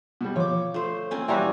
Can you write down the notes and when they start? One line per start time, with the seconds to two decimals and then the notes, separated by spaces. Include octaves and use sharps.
0.21 B2 G3
0.36 F3 C#5 D6
0.74 A3 C5
1.11 A#3 C4 C#4 G#5
1.28 E3 G3 F#4 G5 G#5 A#5 C6